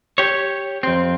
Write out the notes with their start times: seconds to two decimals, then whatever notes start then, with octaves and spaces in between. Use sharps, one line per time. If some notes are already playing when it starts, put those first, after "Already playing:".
0.18 G4 C#5
0.83 F2 C4